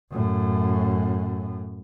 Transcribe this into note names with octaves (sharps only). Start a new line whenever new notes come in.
F#2 A2